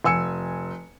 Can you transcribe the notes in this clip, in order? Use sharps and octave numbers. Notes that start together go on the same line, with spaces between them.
F1 G#5 E6 C#7